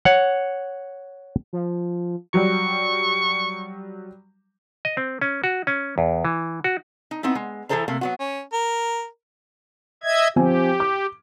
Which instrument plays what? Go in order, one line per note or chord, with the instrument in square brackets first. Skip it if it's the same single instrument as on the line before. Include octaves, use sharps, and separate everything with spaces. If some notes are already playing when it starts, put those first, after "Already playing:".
[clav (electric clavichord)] C#5 F#5
[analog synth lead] F3
[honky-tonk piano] F#3 G3 [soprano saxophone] C#6
[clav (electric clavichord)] D#5
C4
C#4
F#4
C#4
E2
E3
F#4
[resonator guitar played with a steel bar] D#4
B3 C4 D#4 E4
G#3
E3 E4 G#4 A4 C5 A#5
C3 A3 A#3
F#3 B3 F#4
[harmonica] C#4
A#4
[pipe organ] D#5 E5 G#6
[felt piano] F3 C4 G#5 [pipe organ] G4
[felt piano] D6